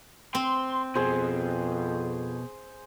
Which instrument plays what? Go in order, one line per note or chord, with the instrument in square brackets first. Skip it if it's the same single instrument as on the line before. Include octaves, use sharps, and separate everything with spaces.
[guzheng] C4 [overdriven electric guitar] C6
[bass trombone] F2 [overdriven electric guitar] B2 [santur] G#4 C5